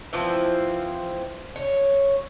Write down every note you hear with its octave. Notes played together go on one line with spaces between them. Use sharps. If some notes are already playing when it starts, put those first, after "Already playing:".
E3 F3 C4
C#5